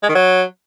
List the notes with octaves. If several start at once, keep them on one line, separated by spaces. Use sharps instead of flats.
G#3
D#3
F#3